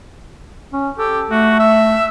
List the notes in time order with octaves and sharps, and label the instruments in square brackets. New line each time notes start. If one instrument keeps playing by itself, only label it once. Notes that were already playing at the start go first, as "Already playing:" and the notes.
[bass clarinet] C#4
[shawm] G4 [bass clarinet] A4
[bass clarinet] A3 [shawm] F#4
[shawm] E5